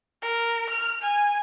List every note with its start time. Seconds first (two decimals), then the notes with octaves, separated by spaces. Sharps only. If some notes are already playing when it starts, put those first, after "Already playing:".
0.22 A#4
0.70 F6
1.02 G#5